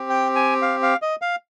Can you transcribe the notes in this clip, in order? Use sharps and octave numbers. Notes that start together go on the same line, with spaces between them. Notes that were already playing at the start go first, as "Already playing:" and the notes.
Already playing: C4 G4
G5
G#5
F5
F5
D#5
F5